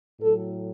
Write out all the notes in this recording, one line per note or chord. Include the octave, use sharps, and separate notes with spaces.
A2 F#3 A4